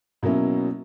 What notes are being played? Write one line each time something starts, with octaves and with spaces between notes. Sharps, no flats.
B2 F#3 A#3 C#4 E4